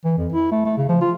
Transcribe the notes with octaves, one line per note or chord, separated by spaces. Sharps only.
E3
F2
E4
A3
A3
C#3
F3
F4